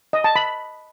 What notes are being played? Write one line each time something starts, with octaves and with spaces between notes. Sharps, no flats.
D#5
A5
B5